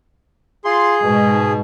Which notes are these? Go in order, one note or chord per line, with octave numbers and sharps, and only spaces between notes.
F4 G#4 C6
G#2 B2